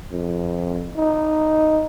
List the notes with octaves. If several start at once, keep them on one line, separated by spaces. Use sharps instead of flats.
F2
D#4